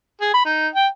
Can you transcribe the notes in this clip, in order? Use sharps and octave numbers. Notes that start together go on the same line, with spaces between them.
G#4
B5
D#4
G5